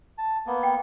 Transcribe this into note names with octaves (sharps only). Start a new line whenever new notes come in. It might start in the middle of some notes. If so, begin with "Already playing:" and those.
A5
A#3 B3
G5